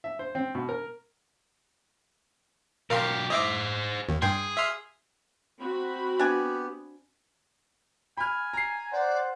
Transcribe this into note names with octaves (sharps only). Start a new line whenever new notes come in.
E5
C5
C4
B2
A#4
B1 G4 A#4 F5 C6
G#4 C5 D#5 E5 D6
D#2
G2 G#4 G5 C6
E5 C6 F6
C4 F#4 B5
B3 D4 G4 G#5
G#5 B5 F6
A#5 C7
C5 D5 F#5